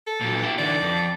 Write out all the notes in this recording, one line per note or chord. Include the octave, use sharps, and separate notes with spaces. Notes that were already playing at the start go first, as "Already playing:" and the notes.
A4
A#2 F#3
E4 G4
D3 E3 D5
F2